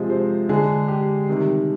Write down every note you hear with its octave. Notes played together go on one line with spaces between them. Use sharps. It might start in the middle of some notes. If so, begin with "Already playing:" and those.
Already playing: C3 F3 G#3
C5
D3 G#3 G#4
G4
C3 D#3 G3